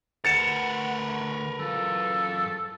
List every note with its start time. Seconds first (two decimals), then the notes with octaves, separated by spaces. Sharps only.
0.25 D2 A#4 B4 F#5 A6 C#7 E7
1.59 F#2 F4 A4